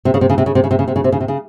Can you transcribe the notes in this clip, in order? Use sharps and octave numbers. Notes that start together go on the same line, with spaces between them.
C3
C#3
C3
C#3
C3
C#3
C3
C#3
C3
C#3
C3
C#3
C3
C#3
C3
C#3